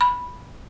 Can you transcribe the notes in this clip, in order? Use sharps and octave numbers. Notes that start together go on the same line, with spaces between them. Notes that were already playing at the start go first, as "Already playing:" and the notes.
B5